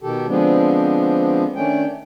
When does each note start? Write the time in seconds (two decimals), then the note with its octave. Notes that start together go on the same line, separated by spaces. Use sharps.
0.02 B2 D#3 G4 A4
0.27 D3 F3 G#3 B3 C4 D4
1.55 D#3 A3 C#4 D4 G5